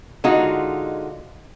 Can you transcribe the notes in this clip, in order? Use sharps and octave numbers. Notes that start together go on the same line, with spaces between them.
D3 G#3 D#4 F4 F#4